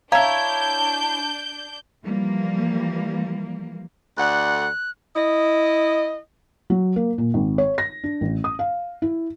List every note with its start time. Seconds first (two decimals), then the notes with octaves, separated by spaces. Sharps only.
0.12 D4 E4 C#5 F5 A5 A#5 G6
2.06 E3 F3 G3 A#3
4.17 D2 D3 F#5 F#6
5.13 E4 D#5
6.70 F#3
6.96 A#3
7.18 A#2
7.34 G#1
7.58 C#5
7.78 A#6
8.04 D4
8.21 A1
8.44 D#6
8.59 F5
9.02 E4